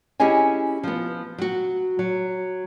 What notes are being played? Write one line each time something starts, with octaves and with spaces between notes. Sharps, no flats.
C#4 E4 G4 G#4 D#5 G#5
F3 B3
F#3 F#4
F#3